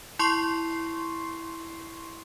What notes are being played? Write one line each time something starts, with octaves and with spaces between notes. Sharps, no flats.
E4 C6 C#6 C7